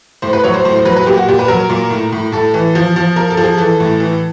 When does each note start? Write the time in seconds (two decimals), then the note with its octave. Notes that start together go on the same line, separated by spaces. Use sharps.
0.22 A2 C5
0.33 B4
0.44 F#3 C#5
0.54 C5
0.65 A2 C5
0.76 C5
0.85 F#3 B4
0.97 B4
1.06 A#2 G4
1.18 F#4
1.28 A#2 G4
1.39 B4
1.48 F#3 A#4
1.69 A#2
1.90 A2
2.12 A2
2.32 A2 A4
2.54 E3
2.75 F3
2.96 F3
3.16 F3 A#4
3.30 A4
3.37 F3
3.43 G#4
3.57 E3 A4
3.80 A2
4.00 E3